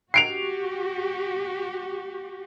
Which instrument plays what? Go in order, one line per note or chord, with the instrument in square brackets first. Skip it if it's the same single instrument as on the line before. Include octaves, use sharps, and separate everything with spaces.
[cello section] F#4 G4 [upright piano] C7 D7 F7